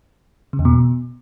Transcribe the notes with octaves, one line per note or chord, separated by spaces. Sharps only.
C#3
E2
B2